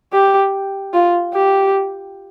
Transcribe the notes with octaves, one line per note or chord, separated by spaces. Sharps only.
G4
F4
G4